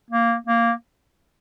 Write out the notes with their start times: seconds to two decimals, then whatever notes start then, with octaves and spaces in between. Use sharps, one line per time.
0.10 A#3
0.47 A#3